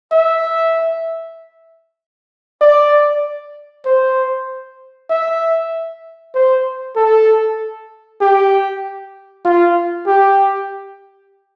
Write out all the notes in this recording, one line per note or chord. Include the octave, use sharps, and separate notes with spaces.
E5
D5
C5
E5
C5
A4
G4
F4
G4